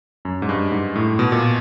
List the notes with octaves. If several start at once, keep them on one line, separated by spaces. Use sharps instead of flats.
F#2
G#2
G2
G#2
A2
B2
A#2